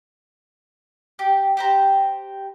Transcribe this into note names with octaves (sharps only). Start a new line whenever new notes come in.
G4
G4 C5 A#5